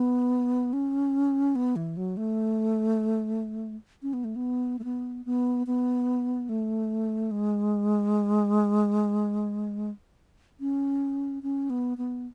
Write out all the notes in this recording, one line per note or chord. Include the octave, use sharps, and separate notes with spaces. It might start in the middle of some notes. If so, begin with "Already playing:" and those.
Already playing: B3
C#4
B3
E3
F#3
A3
C#4
B3
A3
B3
A3
B3
B3
B3
A3
G#3
C#4
C#4
B3
B3